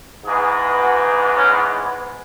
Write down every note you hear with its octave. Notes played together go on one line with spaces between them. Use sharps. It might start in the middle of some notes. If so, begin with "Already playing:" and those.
G#2 E3 G#3 B3 G#4
F#4
C#4